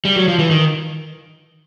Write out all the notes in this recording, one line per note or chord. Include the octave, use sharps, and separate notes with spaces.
G3
F#3
F3
E3
D#3